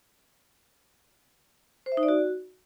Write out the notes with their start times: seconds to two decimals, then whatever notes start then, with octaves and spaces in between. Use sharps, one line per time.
1.86 C5
1.92 E5
1.97 D#4
2.03 D5
2.08 F#4